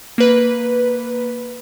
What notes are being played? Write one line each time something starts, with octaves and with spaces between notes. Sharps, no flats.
A#3 B4